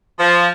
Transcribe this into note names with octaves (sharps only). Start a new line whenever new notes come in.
F3